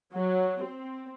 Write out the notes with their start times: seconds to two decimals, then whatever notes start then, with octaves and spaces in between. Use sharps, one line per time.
0.13 F#3
0.62 C4